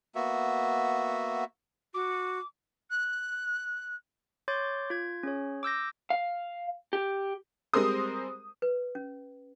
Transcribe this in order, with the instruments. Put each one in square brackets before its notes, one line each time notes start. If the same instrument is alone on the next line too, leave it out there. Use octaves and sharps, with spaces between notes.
[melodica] A#3 B3 F#4 E5
[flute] F#4 [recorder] D6
[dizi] F#6
[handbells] C#5 C6 D6 G6 A6
F4 G#6
C#4 G#4 C#5
D6 E6 G6 A#6
[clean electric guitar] F5
G4
[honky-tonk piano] G3 G#3 C4 A#4 C5 D#6
[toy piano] B4
C#4